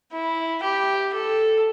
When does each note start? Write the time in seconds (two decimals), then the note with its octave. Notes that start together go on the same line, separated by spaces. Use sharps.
0.12 E4
0.63 G4
1.14 A4